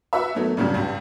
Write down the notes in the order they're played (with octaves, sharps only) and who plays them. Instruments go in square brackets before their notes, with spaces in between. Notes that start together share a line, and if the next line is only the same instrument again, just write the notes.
[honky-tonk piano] F#4 B4 E5
D#3 F#3 A3 B3
A1 G2 C#3 F#3 G3
C#2 G2 G3